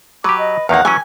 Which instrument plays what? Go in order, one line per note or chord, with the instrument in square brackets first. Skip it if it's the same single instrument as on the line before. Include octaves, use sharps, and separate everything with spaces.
[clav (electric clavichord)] F#3 G4 [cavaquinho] B4 [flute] D6
[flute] D#5
[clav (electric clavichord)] E2 D#3 A#3 [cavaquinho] F5 F#5 [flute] F#6
[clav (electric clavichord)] E3 F#3 C#4 [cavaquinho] G#5